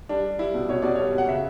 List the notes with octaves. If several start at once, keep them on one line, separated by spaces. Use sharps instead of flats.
G3 D4
G3
G3 E4
B2
B2 C#5
B2 D5
G3 C#5
B2 F#5
C#3 E5